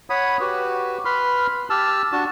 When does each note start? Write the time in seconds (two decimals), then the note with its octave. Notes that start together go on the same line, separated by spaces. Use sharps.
0.10 C#5 F#5 B5 D#6
0.40 F#4 G4 B4
1.05 B4 B5 C6 F6
1.70 G4 A5 E6 F6
2.12 D4 F#4 A5